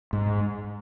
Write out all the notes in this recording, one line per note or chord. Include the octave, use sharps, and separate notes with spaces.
G#2